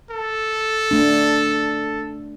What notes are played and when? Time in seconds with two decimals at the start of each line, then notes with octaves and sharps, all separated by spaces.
0.11 A4
0.91 A3 D4